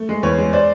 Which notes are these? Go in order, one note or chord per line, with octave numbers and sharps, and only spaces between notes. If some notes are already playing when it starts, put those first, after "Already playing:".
Already playing: A3
G#3
E2 B4 C#5
G#3
C5 D5